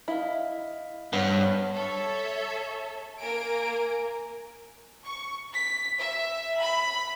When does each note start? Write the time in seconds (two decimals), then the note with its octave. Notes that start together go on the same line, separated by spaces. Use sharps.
0.08 E4 D#5 F5
1.13 G2 B3 C5 C#5 F#5
1.75 A4 C#5 E5
3.20 A#3 A#4 G#5 D7
5.05 C#6
5.52 B6
5.98 E5
6.59 B5